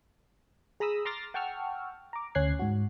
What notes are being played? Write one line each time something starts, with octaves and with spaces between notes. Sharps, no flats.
G#4 A#5 B5 D#6 E6
A#5 C6 D6 F6 A6 A#6
F#5 G5 A5 C#6 E6 F6
A#5 D6
D2 C#4 F#6 G#6 C7
G#2 F#4